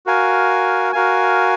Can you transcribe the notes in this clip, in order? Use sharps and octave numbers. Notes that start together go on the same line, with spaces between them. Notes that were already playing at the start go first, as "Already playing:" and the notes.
F#4 A#4 F5 G#5
F#4 A#4 F5 G#5